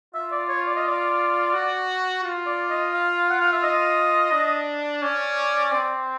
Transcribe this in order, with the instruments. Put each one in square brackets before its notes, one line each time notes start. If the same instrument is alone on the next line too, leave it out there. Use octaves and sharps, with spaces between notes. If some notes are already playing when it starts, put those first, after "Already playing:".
[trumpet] F4 [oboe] E5
[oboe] D5
C#5
D5
D#5
D5
[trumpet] F#4
F4
[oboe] D5
D#5
F5
F#5
F5
E5
D#5
[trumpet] D4
[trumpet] C#4 [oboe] D5
[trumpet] C4